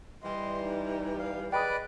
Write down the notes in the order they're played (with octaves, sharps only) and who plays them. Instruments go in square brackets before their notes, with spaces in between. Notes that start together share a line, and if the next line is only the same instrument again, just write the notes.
[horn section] E3 G3 [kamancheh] D#5 C6
[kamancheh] D#4
[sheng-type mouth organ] F5
[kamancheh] G#4 D#5 [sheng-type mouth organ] B4 D5 [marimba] G5 B5 D#6